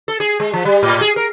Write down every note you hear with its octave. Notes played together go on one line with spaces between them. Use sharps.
A4
G#4
G#3
F3
G3
A2
G#4
A#4